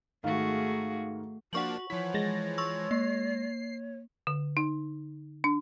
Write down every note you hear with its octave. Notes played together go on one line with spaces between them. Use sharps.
G#2 D#3 A3 F#4 G#4 F5
F3 A#3 D4 F#4 F#5 C#6 F#7
E3 F3 C#5 B6
G#3 A6 A#6
C6 C#6 E6
A#3 C7
D3
D#4
D4